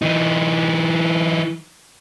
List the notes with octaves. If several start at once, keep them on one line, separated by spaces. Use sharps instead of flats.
E3 D#4